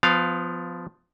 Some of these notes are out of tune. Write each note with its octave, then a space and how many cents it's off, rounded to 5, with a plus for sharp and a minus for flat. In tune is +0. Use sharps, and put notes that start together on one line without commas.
F3 +0 B3 +25 F5 +0